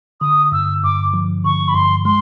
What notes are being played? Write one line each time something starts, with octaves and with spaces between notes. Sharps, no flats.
D3 D#6
G2 E6
G2 D6
F3
D3 C#6
B5
G2 C6
G#3 C6